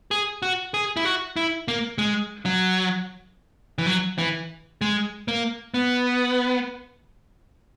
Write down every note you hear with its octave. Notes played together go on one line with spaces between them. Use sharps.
G#4
F#4
G#4
E4
F#4
E4
A#3
G#3
F#3
E3
F#3
E3
G#3
A#3
B3